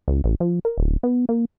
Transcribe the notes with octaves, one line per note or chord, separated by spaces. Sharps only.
C#2
A1
F3
A#4
D1
B3
A#3